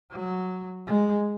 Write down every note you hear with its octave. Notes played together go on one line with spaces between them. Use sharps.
F#3
G#3